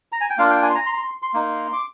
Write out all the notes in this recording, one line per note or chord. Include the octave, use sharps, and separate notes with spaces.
A#5
G#5
G5
A#3 D4 F4 F5
G5
G#5
C6
A#5
C6
A#5
C6
C6
A#3 D#4
D6